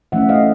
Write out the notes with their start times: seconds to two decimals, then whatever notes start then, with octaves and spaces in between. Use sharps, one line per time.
0.12 E3 A3 C#4 E5 F#5
0.29 D#5 F5